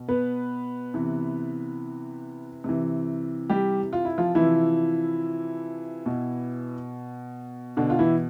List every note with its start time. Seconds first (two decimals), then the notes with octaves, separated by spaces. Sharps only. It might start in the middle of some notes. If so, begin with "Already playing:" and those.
Already playing: B2
0.08 B3 B4
0.94 C3 E3
2.64 C3 E3
3.50 G3 G4
3.93 F4
4.05 E4
4.18 F3 F4
4.35 C3 E3 F3 E4
6.06 B2
7.77 B2 D3 D4
7.90 F4
7.99 E3 E4